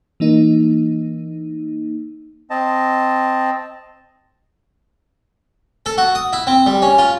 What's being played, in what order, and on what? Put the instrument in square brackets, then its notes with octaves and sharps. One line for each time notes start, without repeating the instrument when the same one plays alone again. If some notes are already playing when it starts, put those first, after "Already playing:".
[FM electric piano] E3 A#3 D#4
[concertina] C4 D#5 A5
[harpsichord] A4
F#4
D#6
E4
C4
G3
C#4
F4